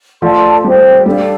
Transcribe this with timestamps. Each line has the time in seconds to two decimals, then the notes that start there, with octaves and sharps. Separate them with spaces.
0.22 F3 A3 A4 D5 A5 C6
0.64 G3 G4 C5 G5
1.06 G3 D4 A4 D5 F5